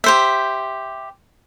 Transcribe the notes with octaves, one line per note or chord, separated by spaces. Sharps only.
G4 C5 E5